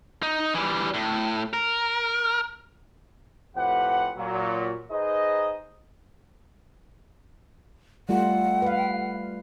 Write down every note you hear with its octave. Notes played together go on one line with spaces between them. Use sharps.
D#4
E3 G3
A2
A#4
F2 A2 C4 G4 B4 F#5
A#2 F#3
D#4 G#4 B4 C5 D#5
G3 A3 F4 F#5
B4 F5